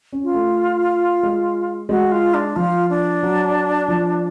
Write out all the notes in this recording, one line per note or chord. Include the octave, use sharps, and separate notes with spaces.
C#4
F4
A3
G#3
G#3 F#4
F4
D4
F3 F4
D4
F#3
F3